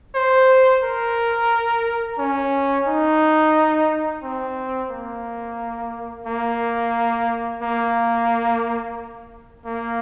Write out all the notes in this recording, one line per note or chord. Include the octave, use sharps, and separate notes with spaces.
C5
A#4
C#4
D#4
C4
A#3
A#3
A#3
A#3